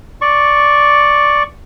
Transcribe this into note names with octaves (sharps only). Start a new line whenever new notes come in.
D5 C#6